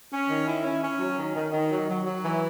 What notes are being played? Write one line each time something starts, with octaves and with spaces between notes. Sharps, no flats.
C#4
D#3
E4
C#4
C#4
F#3
D#3
D#3
D#3
F#3
F#3
F#3
E3